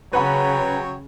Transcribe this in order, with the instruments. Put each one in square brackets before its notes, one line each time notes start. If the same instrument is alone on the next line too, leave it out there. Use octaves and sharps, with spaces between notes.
[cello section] C#3 [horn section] F#3 C#5 G5 [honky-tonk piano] B4 F#5 B5 [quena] A#5